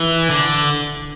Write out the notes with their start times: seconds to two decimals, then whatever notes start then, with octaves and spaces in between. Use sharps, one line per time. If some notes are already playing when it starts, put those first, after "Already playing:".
Already playing: E3
0.30 D3